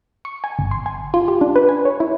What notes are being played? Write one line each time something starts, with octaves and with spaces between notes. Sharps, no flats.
C#6
G#5
G1
C6
G#5
F4
G4
D4
B4
G#5
C#5
E4